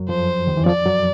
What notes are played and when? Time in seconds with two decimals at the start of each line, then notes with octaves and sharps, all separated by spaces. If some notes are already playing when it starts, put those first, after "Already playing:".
Already playing: F#2 F#3
0.09 F2 F3 C5
0.47 D#2 D#3
0.57 E3
0.66 F2 F3 D5
0.85 F#2 F#3